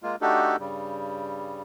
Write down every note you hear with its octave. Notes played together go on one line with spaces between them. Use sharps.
G#3 A#3 F4
A3 D4 D#4 F#4 G4 A4
G2 C#3 G3